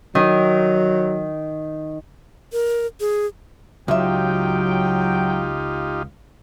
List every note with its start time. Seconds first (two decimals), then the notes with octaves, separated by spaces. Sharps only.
0.15 D#3 F#3
2.53 A#4
3.00 G#4
3.88 C#2 F#3 D#4 F4 G4 E5 G5